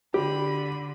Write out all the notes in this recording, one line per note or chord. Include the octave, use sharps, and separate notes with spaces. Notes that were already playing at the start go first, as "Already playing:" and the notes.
D3 G4 B5